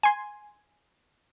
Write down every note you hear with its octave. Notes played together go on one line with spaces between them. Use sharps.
G#5 C6